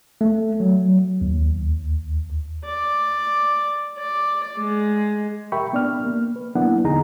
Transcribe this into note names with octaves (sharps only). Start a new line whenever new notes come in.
A3
F#3
D#2
D5
D5
G#3
G4 A#4 E5 G5 B5 C#6
B3 D4 D5 F6
A#3
B4
F#3 A#3 B3 D4 E4 F#5
E2 D3 D#4 G#4 A#5